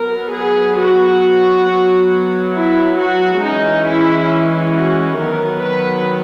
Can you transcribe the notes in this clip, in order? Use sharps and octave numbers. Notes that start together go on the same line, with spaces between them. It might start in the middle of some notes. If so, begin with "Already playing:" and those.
Already playing: F#3 B3 A#4
G#4
F#4
F#3 B3
E4
F#4
E3 G#3 C#4 D#4
E4
F#4
D#3 F#3 B3 A#4
B4